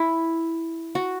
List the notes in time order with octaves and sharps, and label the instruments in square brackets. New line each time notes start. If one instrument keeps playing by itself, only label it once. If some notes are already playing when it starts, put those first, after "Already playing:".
Already playing: [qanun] E4
F#4